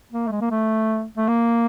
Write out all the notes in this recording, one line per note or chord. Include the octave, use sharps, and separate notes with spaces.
A#3
A3
G#3
A#3
A3
A3
A#3